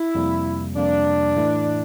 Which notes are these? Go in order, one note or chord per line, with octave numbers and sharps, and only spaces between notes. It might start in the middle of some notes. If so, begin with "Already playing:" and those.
Already playing: E4
F2 C3 G3 A#3
F2 C3 G3 A#3 D4
A2 E3 A3 E4